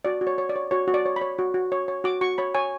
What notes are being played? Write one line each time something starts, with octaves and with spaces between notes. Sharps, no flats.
F#4 D5
F#4
C#5
C#5
D5
C#5
F#4 C#5
F#4
D5
C#5
B5
C#5
F#4
F#4
C#5
C#5
F#4 D6
F#4 C#6
C#5 B5
C#5 G#5